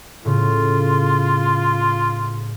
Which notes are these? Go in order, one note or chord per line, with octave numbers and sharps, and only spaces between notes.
A2 C#3 F4